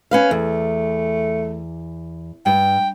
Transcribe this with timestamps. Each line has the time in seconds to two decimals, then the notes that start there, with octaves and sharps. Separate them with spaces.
0.11 C#4 B4 F5
0.31 E2 A3
2.46 G2 G5